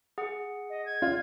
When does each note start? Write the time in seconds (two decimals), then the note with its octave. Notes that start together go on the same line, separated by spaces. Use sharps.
0.18 G#4 F#5
0.70 D#5
0.86 G#6
1.02 F4